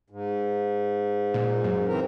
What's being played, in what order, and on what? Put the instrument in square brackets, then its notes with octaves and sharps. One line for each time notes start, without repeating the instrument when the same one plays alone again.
[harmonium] G#2
[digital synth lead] A#2
F#2
[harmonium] E3 C4 A#4